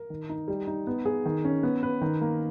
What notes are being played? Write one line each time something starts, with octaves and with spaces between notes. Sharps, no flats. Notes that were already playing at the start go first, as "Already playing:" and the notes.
Already playing: A#4
D#3
D#4
G3
D#4
B3
G#4
D#3
C#4
B3
B4
D#3
A#3